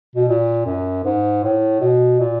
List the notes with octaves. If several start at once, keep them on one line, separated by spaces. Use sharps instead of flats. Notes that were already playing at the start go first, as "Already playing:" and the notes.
B2
A#2
F#2
G#2
A2
B2
A#2